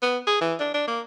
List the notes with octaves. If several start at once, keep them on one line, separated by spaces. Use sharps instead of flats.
B3
G#4
E3
D4
D4
A#3